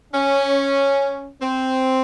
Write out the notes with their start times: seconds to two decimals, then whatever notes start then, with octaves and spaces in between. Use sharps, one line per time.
0.12 C#4
1.41 C4